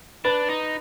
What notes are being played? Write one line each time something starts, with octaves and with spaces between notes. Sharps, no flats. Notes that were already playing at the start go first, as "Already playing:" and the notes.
D4 B4
D#4